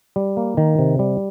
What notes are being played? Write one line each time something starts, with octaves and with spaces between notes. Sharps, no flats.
G3
A#3
D#3
C3
G3